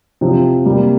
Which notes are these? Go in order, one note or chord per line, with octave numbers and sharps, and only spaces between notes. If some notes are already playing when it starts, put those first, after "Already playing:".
C3 F3 C4
C3 G3 A#3